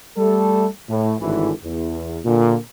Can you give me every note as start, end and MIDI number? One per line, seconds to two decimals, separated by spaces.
0.18 0.66 55
0.18 0.66 57
0.18 0.66 69
0.89 1.14 45
1.20 1.51 32
1.20 1.51 45
1.20 1.51 50
1.20 1.51 52
1.65 2.19 40
2.25 2.56 46
2.25 2.56 50